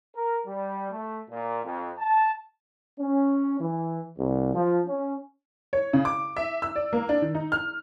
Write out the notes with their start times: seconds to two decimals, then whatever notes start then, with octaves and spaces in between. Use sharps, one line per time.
0.15 A#4
0.45 G3
0.91 A3
1.29 A#2
1.63 F2
1.98 A5
2.99 C#4
3.60 E3
4.19 C2
4.54 F3
4.87 C#4
5.73 C#5
5.93 C#3
6.05 D6
6.36 E5
6.62 E6
6.76 D5
6.93 A#3
7.09 D4
7.22 D#3
7.35 D#4
7.52 F6